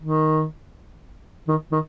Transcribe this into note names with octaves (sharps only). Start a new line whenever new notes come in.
D#3
D#3
D#3